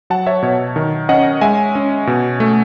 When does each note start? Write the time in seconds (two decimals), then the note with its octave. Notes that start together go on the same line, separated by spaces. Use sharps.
0.10 F#3 F#5 A5
0.26 C#5 E5
0.43 B2 C#5
0.76 D#3
1.09 C#4 D#5 F#5
1.41 G#3 E5 G#5
1.75 C#4
2.07 B2
2.40 A3